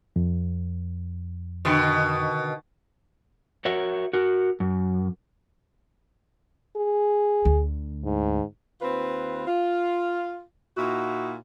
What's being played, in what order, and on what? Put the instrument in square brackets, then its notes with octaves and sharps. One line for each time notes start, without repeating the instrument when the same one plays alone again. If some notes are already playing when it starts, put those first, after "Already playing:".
[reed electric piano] F2
[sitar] B2 D3 D#3
[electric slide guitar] F#4 A#4 C#5 E5 F#5
F#4 A#4
F#2
[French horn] G#4
[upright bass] D2
[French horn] G#2
[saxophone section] D#2 C4 F4 B4
F4
A#2 D#4 E4 F#4